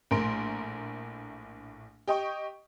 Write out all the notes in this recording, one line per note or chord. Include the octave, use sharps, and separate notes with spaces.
A#1 A2 A#4 C6 D7
G4 D#5 G5 C#6